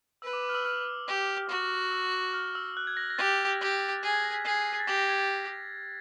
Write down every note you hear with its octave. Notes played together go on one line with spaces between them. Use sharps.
B4 E6
D6
D6
F6
E6
F6
G4 E6
F#4
E6
F6
E6
F#6
G#6
A#6
A#6
G4 A6
G4
G#4 A6
G#6
A#6
B6
G#4 C7
A6
G4 A#6
A#6
G#6
A6